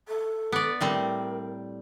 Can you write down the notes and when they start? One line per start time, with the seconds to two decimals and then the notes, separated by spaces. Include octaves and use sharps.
0.08 A4
0.52 B3 D5
0.81 A2 G3 C4 A#4